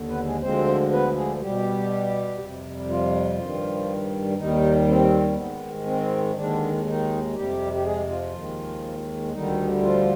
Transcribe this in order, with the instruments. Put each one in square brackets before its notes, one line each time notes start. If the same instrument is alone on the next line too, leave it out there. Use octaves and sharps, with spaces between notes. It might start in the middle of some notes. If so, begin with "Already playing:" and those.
Already playing: [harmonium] D#2 D3
B3 B4
G#3 G#4
D2 D3 F3 G#3 C4 C5
B3 B4
G#3 G#4
B2 G3 G4
F2 C3 G3
F3 F4
G2 D#3 G3
D#2 D#3 G3 D#4
C4
G#2 D#3 G#3 B3
C4
D#2 D3 D#3 G#3 D4
D#3 D#4
F2 C3 G3 G4
G4
G#3 G#4
F3 F4
D#2 D#3 G#3
D2 D3 D#3 G3 D#4
F3 F4